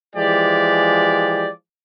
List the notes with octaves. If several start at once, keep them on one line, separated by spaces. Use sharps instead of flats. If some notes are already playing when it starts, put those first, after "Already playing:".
E3 F3 G#3 G4 D5